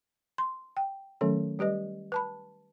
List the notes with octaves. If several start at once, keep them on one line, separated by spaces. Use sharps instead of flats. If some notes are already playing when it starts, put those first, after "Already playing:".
C6
G5
D#3 F#3 A3 C#4 A4
G3 G4 B4 D#5
B4 A5 B5